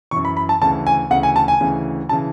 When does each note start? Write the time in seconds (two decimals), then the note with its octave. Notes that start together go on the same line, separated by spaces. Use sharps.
0.11 F#2 E3 C#6
0.25 B5
0.37 B5
0.49 A5
0.61 D2 C#3 E3 A5
0.87 G#5
1.11 D2 C#3 E3 F#5
1.23 G#5
1.36 A5
1.48 G#5
1.60 D2 C#3 E3
2.09 C#3 E3 A5